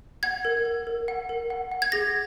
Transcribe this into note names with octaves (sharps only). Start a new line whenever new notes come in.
F#5 G#6
A#4
A#4
A#4
F#5
A#4
F#5
F#5
G#6
G#4 A#6